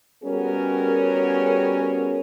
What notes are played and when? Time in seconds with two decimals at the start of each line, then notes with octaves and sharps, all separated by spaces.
0.24 G3 B3 C#4 F#4 G#4 A#4